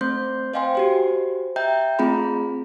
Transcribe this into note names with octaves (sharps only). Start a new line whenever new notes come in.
A3 C4 C5 C6 G6
C5 D#5 F5 G5 G#5 C6
F#4 G4 C5
D#5 E5 G5 A#5 G6
A3 C4 F4 G#4 A#5 B5